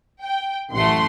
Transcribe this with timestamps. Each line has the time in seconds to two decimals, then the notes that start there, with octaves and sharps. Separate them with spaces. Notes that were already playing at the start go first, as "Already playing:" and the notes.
0.22 G5
0.72 A1 F#2 A3 F#5 C6